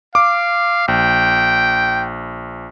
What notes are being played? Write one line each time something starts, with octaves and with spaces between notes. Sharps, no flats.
F5 D6
A#1 G5